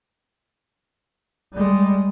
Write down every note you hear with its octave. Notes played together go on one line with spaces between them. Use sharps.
G3 G#3